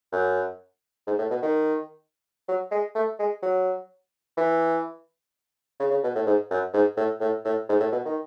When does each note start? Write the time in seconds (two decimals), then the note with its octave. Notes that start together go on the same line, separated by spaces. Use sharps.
0.12 F#2
1.07 G#2
1.19 A2
1.30 B2
1.42 D#3
2.48 F#3
2.72 G#3
2.95 A3
3.19 G#3
3.42 F#3
4.37 E3
5.80 C#3
5.91 C#3
6.03 B2
6.15 A2
6.26 G#2
6.51 F#2
6.74 G#2
6.97 A2
7.21 A2
7.45 A2
7.69 G#2
7.80 A2
7.92 B2
8.05 D#3